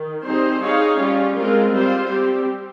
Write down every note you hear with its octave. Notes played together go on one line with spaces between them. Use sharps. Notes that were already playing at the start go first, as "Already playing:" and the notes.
Already playing: D#3
G3 C4 D#4 G#4 C5
D#4 G#4 C#5 F5
G3 C#4 F4
G#3 C4 F4 A#4
G3 C4 F4 C5
G3 C4 G4